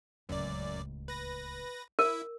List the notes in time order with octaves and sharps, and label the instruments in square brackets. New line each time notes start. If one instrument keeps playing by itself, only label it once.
[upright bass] D1 C#2 [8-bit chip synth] F#2 D5
[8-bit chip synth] B4 A#6
[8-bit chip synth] E4 E5 [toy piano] A#4